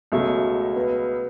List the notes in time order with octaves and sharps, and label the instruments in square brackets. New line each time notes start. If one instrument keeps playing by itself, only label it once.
[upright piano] C#2 B2 F#3 [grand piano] A3
[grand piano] B3